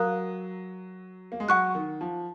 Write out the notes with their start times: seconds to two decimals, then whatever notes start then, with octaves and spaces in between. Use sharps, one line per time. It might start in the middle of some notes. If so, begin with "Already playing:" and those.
Already playing: F#3 A#4 F5 A#5 D#6 F#6
1.32 A#3
1.40 G#3
1.48 F#3 F#5 C#6 F#6
1.75 D#3
2.01 F3